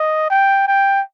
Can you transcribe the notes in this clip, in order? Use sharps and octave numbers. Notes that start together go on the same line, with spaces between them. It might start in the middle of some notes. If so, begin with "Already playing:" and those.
Already playing: D#5
G5
G5